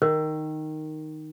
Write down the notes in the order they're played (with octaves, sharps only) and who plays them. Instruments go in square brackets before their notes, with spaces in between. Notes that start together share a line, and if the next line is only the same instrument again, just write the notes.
[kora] D#3 [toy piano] A#4